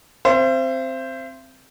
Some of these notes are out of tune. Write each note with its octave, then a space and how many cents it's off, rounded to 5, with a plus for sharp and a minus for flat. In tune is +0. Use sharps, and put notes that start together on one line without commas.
C4 +0 C5 +0 E5 +45